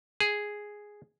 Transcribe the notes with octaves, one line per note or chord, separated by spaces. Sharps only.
G#4